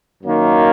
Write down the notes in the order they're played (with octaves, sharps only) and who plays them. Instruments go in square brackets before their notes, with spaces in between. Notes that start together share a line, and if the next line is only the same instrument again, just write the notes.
[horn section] F#2 D#3 A#3